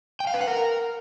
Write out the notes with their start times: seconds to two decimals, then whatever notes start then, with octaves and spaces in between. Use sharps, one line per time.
0.20 G5
0.27 F5
0.34 B4
0.41 F#5
0.48 A#4